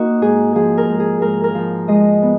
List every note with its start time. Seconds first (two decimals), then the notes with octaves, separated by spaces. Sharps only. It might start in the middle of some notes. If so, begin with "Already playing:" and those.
Already playing: A#3 D#4 F#4
0.21 G#2 G#4
0.55 F3 G#4
0.78 A#4
0.89 G#2
1.00 G#4
1.21 G#2 A#4
1.44 A#4
1.55 F3
1.88 G#3 D#5
2.22 B3